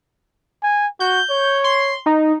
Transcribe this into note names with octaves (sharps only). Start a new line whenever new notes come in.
G#5
F#4 G6
C#5
C6
D#4